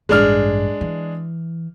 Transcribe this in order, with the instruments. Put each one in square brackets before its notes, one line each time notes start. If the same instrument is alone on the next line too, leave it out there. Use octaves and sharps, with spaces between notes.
[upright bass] A1 G2 [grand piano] G#3 D4 F6
[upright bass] E3